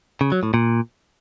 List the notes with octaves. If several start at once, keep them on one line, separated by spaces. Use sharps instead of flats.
C#3
F#3
A2
A#2